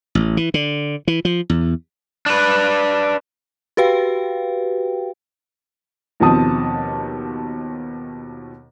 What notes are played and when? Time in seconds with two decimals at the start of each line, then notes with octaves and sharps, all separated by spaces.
0.15 A1
0.37 E3
0.54 D3
1.08 E3
1.25 F3
1.49 E2
2.26 D4 B4
3.77 F#4 G4 B4 F5 G5
6.20 D#2 B2 F3 C4 A5 D#6